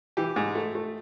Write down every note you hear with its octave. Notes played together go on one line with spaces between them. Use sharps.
E3 G4
G#2
A3
A3